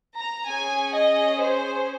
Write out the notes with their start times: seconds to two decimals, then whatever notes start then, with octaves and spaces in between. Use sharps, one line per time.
0.18 A#5
0.47 C#4 G#4 G#5
0.94 D#5
1.40 C5